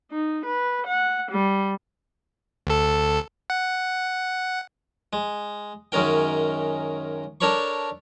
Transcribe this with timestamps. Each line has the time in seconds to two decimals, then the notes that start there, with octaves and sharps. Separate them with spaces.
0.11 D#4
0.45 B4
0.87 F#5
1.31 G3
2.67 D2 A4
3.50 F#5
5.13 G#3
5.92 F#2 D#3 G#3 C#4 A#4 G5
7.41 D4 A4 A#4 C#5 B5 C#6